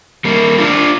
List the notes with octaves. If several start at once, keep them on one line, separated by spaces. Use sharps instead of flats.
G3 A#3
D4 F4